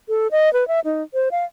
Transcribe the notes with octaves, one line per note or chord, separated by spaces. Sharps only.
A4
D#5
B4
E5
D#4
C5
F5